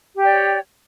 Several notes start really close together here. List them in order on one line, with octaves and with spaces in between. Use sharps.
G4 G5 D5 C#5